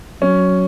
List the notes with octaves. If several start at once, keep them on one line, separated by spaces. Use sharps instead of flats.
F#3 C#4